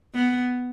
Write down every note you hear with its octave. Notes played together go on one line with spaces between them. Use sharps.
B3